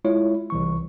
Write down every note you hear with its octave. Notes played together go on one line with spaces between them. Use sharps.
G#3 E4 F4 C#5
C2 E3 C#6